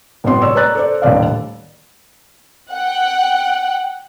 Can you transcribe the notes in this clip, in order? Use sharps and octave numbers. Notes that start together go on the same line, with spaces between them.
G1 A2 F#3 B3 C6
C#5 D5 E6
B4 C#5 D5 A#5 F#6 A6
A4 C5 D5
D#1 A2 D3 D5 F5
F#5 G5